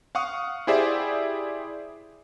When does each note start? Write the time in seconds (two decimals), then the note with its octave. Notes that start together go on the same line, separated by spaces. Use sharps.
0.15 F5 F#5 C#6 D#6
0.67 E4 G4 G#4 C5 D5 E5